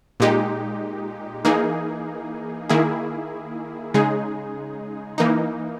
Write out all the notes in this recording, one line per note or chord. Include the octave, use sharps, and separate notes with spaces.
A#2 G#3 D#4 G4
E3 A#3 D#4 G#4
D#3 A#3 E4 G#4
C#3 G#3 D#4 G#4
E3 A#3 D#4